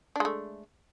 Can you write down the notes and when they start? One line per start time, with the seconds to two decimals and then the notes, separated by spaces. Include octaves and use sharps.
0.16 D4
0.20 G#3
0.25 A3